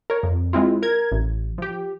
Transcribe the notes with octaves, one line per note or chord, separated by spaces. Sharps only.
A#4 C#5
F2
G#3 C4 E4 F4
A#4 G#6
A1
F3 G4